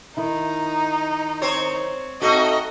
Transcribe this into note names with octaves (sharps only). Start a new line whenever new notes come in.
D#3 D#4 E4
C4 C5 C#5
A3 C4 D#4 F#4 A4 D#5